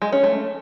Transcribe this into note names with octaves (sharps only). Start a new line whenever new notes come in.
G#3
C#4
A3